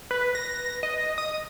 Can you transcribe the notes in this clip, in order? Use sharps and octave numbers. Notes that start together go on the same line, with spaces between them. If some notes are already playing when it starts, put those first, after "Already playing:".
B4
A#6
D#5
D#6